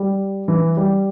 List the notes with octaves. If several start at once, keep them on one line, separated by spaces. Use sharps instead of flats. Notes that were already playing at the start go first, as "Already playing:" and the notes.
Already playing: G3
E3
G3